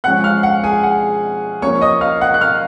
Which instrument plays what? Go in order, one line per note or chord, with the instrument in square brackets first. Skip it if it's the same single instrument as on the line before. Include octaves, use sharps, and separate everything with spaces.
[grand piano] F3 G#3 C#4 F#5 F#6
F5 F6
F#5
G#4 G#5
F#5
F3 A#3 C#4 C#5 C#6
D#5 D#6
F5 F6
F#5 F#6
F#6
F5 F6